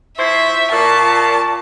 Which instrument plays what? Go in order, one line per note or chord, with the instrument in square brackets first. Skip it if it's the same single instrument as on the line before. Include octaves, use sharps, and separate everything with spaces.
[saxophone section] F3 E4 C5 [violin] E5 [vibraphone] C#6
[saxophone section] A#2 [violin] A5 [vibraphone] C#6 D6